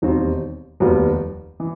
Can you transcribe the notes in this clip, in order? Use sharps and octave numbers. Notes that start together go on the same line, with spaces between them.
E1 D#2 D#3 G3 C4
F1 D#2 D#3 G3 B3
E3